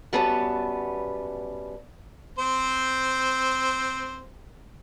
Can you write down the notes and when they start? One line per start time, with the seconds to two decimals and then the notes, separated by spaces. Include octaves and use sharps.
0.13 F#2 G3 B3 B4 C#5 A5
2.38 C4 C5